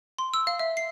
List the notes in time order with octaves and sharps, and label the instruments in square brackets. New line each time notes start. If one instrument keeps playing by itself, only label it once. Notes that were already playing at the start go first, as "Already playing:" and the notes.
[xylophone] C6
E6
F5
E5
C7